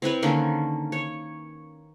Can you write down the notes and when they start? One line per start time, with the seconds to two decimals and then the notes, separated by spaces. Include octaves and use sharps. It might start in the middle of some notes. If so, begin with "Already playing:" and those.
0.02 C4 E4 B4 C#5
0.23 D3 D#3 A#3 C#4
0.92 C#5